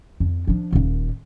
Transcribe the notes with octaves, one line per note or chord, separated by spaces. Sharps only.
F2
F3 D4
D#1 A#2